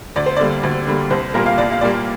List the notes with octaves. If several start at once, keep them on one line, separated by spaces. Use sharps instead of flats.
D2 D5
C5
D3 G3 A#3 D5
D2
D3 G3 A#3
C2 C5
A#2 G3 A#3 A#4
F5
C2 D5
F5
A#2 G3 A#3 D5